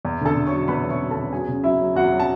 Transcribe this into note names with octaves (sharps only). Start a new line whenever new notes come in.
E2
D3 A4 A5
D3
C#5 C#6
F#3
E2 B4 B5
E2
C#5 C#6
F#3
A4 A5
E2
F#3 G#4 G#5
C#3
F#3 E4 E5
F#3
E2 F#4 F#5
F#3
A5